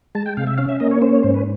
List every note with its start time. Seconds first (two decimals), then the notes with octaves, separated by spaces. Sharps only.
0.15 G#3 A5
0.26 G5
0.37 C3 F5
0.47 E5
0.58 C#4 F5
0.69 E5
0.80 A#3 D#5
0.91 C#5
1.02 C#4 C5
1.13 C#5
1.23 G#2 C5
1.34 B4